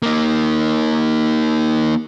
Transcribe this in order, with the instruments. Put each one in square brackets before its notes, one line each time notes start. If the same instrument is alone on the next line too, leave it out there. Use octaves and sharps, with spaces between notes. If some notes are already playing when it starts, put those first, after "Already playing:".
[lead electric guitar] A#3 D#4